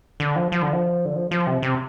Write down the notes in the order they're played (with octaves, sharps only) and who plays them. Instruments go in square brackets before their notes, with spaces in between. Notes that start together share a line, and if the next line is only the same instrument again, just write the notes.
[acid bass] D3
F3
F3
D3
F3
D3
F3
F3
C3
C3